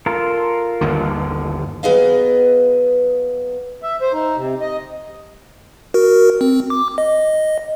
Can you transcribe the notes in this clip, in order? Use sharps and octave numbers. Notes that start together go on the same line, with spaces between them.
F4 A4 A#4
G1 D#2 D3
F#3 B3 G#4 D#5 F5
E5
C5
D#4
C3
D#5
F#4 A#4
C4
D6
D#5